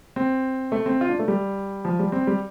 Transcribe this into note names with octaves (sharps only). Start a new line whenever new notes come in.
C4
A3
C4
F4
D4
A3
G3
F3
G3
C4
G3